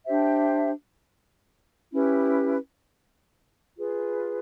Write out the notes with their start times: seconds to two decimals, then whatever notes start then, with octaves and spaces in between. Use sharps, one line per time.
0.06 D4 G4 C5 E5
1.91 C#4 E4 G4 B4
3.78 F4 G#4 B4